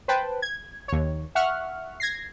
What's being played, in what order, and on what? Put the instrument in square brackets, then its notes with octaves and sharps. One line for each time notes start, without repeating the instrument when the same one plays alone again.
[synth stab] B4 C5 G5 A5
G#6
D#2 C#5
E5 F#5 C#6 F6
G#6 A#6 C7